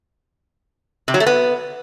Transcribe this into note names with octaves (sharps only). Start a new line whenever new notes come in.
C3
F#3
A3
B3